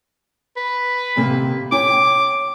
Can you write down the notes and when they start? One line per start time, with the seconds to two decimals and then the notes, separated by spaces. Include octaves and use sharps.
0.56 B4
1.16 D#2 C3 A#3
1.72 C#5 G5 D6